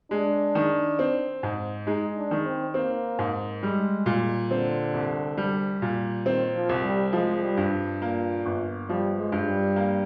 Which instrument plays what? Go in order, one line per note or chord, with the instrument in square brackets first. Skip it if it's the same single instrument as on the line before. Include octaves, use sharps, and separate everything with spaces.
[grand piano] G#3 [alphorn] D4
[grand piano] D#3
C4
G#2
[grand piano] G#3 [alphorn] D#4
[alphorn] D4
[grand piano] D#3
[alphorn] C4
[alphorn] A#3 [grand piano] C4
[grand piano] G#2
[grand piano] G3 [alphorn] G#3
[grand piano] A#2
[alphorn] D3 [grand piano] C4
[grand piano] C2
G3
A#2
[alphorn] D#3 [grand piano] C4
[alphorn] F3
[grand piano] C2
[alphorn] G3
[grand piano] F3 [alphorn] G#3
[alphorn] G3
[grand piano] G2
[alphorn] A#2 [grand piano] A#3
[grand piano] G1
[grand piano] F3 [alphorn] G3
[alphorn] G#3
[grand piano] G2
[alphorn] G3
[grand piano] A#3